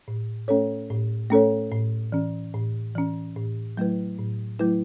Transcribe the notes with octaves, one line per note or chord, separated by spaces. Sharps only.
A2
A3 C#4 A4 C#5
A2
A3 C#4 A4 C#5
A2
E3 C#4
A2
E3 C#4
A2
F#3 A3 E4 B4
A2
F#3 A3 E4 B4